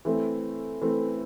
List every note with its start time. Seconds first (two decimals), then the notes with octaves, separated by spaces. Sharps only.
0.05 E3 A3 C4
0.81 E3 A3 C4